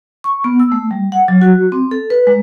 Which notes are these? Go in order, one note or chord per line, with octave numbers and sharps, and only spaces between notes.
C#6
B3
E6
A3
G3
F#5
F#3
F#4
C4
A4
B4
G#3